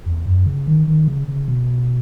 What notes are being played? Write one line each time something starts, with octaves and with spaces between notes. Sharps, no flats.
E2
F#2
C#3
D#3
D#3
C#3
C#3
B2